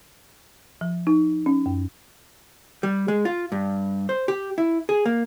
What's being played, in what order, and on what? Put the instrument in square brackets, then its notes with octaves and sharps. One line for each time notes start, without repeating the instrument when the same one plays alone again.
[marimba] F3
D#4
C#4
F#2
[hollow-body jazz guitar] G3
G#3
F4
G2
C5
G4
E4
G#4
A#3